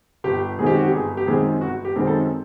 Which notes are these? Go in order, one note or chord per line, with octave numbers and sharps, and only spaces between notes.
G1 G4
F#2 D#3 G#3 C4 G#4
G4
F#4
G4
G1 G#4
G4
F#2 D#3 G#3 C4 G#4
G1 F#4
G4
F#2 D#3 G#3 C4
A4